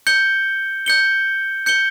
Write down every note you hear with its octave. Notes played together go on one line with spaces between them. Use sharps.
G6 C#7 G7
G6 C#7 G7
G6 C#7 G7